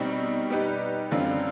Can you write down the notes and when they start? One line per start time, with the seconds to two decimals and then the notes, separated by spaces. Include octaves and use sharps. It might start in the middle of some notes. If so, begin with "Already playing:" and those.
Already playing: B2 G3 C4 D#4
0.50 G3 B3 D#4 G4 B4
1.11 F#2 D3 G3 C4 F4